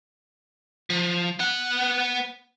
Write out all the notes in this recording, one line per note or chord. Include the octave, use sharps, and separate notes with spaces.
F3
B3 F#5